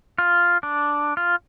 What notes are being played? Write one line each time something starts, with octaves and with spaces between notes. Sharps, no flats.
F4
D4
F4